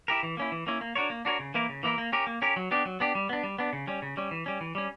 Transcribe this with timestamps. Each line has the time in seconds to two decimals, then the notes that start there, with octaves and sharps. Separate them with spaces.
0.08 E4 G4 A#4
0.23 E3
0.37 A#3 C#4 E4
0.52 E3
0.67 A#3 C#4 E4
0.81 A#3
0.95 D4 F#4 A#4 C#5
1.10 A#3
1.25 D4 F#4 A#4 C#5
1.39 C#3
1.54 E3 A#3 E4 A#4
1.69 C#3
1.83 E3 A#3 E4 A#4
1.98 A#3
2.12 C#4 G4 A#4
2.27 A#3
2.42 C#4 G4 A#4
2.56 F#3
2.71 B3 D4 G4
2.85 F#3
3.00 B3 D4 G4
3.15 G3
3.29 B3 D4
3.43 G3
3.59 B3 D4
3.73 C#3
3.87 G3 C#4
4.02 C#3
4.17 G3 C#4
4.31 E3
4.46 G3 C#4
4.61 E3
4.75 G3 C#4